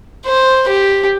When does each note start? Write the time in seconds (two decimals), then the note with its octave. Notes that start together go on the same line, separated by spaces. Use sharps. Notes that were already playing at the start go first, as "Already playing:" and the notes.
0.26 C5
0.68 G4